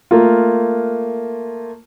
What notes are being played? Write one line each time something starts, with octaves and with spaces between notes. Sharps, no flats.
A3 A#3 F4